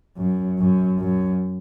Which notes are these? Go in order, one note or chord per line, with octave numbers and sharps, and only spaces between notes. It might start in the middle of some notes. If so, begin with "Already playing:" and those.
F#2
F#2
F#2